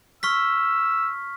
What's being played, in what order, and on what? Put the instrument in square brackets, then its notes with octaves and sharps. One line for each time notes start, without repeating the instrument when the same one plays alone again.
[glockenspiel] C#6 F6 B6 [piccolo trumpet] E6